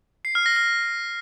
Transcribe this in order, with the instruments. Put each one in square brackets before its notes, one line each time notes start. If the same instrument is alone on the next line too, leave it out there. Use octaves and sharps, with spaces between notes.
[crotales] C7
F6
A#6
F6